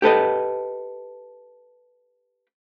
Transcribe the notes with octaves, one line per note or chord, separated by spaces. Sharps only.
G4 A4 B4 D#5